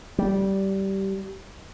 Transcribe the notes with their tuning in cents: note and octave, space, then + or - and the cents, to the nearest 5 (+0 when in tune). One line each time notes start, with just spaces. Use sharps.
G3 -15